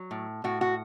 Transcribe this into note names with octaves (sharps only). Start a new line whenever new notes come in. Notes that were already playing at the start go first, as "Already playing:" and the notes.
Already playing: F#3
A2
A2 F#4
F#4